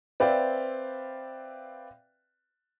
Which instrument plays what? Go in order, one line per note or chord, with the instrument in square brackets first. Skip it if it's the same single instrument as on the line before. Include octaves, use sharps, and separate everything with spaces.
[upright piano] C4 B4 D5 E5 F5 G5